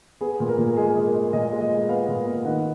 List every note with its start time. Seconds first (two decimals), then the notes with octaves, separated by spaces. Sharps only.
0.21 B3 G#4
0.40 A#2
0.49 A#4
0.58 A#2
0.77 G#3 G#4
0.96 G#3 G#4
1.05 A#4
1.15 G#3
1.33 A#2 D#5
1.52 G#3
1.61 D#5
1.70 G#3
1.89 B3 F5
2.08 A#2
2.27 B3
2.45 D#3 F#5